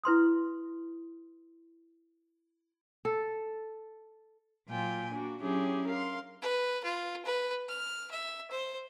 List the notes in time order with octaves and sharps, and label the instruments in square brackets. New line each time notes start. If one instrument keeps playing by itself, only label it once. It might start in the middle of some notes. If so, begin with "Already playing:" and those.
[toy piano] E4 B4 C6 D#6
[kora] A4
[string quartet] A#2 F#3 F4 G5 G#5
A#3 D4 F#4
F#3 C#4 D4 E4 G4 G#4
A#4 F5 C6
[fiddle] B4
F4
B4
F6
E5
C5